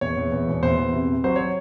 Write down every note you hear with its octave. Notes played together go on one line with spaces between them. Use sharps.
E2 C#5
E2
E2
E1
E2 C5
E2
C3
C3
F#3 C5
F#3 C#5